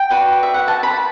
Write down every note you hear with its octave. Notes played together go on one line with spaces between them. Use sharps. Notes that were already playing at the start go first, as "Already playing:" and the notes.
Already playing: G5
F#4 B4 D5
E5
F#5
A5
B5